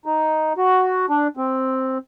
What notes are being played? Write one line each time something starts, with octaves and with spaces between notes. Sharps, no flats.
D#4
F#4
D4
C4